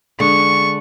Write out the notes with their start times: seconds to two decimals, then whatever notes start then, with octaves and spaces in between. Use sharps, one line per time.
0.20 D3 G#3 C#6